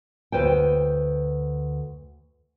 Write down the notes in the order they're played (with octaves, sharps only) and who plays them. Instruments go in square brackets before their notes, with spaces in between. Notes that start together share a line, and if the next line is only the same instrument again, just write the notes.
[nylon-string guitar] D2 B4 C5 G5